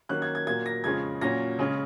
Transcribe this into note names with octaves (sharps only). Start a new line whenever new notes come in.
D#3 F#3 A#3 C#4 F#6
G#6
G#6
A#2 F#3 A#3 G#6
A#6
F2 C#3 F3 G#3 C#4 G#6
A#2 F#3 C#4 A#6
C#3 G#3 C#4